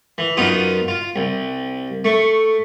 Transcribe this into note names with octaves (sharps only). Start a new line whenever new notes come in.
E3
F#2 B3 D#4 F4 D#6
F4
C2
A3 C#6